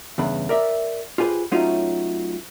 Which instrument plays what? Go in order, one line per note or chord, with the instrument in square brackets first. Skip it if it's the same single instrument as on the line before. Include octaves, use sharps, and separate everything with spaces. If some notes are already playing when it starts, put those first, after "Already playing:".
[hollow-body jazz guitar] E2 G2 C#3 B3 B4
A#4 D5 E5
F4 G4 G#4 B4 C5
F#3 A3 C#4 D#4 F4 F#4